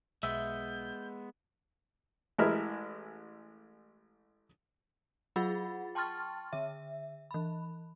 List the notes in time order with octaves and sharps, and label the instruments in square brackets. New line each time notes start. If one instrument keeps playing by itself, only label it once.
[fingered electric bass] B1 [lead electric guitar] G#3 B3 [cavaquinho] E5 [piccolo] G6
[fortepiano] A1 G#3 E4 A#4 E5 F6
[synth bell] F#3 F4 G#4 F#5 B5 A6
G5 A5 C6 C#6 F6 A6
D3 E5
E3 B5